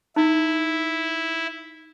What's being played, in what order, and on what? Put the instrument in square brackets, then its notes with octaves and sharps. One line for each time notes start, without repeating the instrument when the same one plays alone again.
[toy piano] D#4 [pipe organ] E4